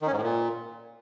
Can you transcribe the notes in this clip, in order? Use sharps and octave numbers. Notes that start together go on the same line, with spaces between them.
D#3
C#4
G#2
A2
A#2